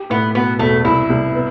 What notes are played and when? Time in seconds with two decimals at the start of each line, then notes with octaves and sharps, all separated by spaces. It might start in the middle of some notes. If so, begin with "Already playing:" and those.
Already playing: G4
0.10 A2 B3
0.35 B2 B3
0.59 E1 A3
0.84 C2 E4
1.10 C2
1.35 B3